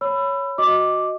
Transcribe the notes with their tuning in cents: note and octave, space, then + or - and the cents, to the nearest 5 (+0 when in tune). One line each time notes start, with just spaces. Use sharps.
C#5 +5 B5 +10 E6 +30
F#4 +0 D#5 +0 D6 +0